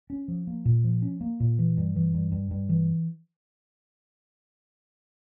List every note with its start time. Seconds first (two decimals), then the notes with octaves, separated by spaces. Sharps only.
0.10 C#4
0.28 F3
0.47 A#3
0.65 A#2
0.84 F3
1.02 C#4
1.21 A#3
1.40 A#2
1.59 E3
1.77 G2
1.96 E3
2.14 G2
2.32 G2
2.51 G2
2.69 E3